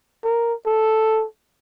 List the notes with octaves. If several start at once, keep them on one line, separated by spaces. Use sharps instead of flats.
A#4
A4